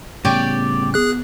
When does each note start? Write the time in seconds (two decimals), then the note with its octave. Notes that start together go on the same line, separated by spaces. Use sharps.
0.25 A2 C#3 G3 B3 G4 C#5 D5
0.94 B3 G#4 F#6